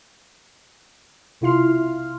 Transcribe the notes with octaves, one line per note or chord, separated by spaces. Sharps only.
B1 C3 E4 F4 C6 F6